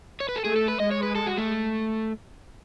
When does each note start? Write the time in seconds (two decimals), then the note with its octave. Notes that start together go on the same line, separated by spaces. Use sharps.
0.20 C#5
0.29 B4
0.36 A4
0.44 A3 G#4
0.56 A4
0.68 B4
0.80 G#3 D#5
0.91 C#5
1.03 B4
1.15 A4
1.27 F#4
1.38 A3